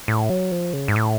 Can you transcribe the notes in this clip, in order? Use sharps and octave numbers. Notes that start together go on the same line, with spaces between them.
A2
F#3
F3
C#3
G#2
A2